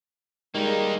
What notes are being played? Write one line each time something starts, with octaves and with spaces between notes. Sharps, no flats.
D#3 G3 G#3 A#3 D#4